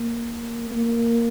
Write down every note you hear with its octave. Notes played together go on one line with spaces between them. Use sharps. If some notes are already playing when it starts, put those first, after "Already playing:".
Already playing: A#3
A#3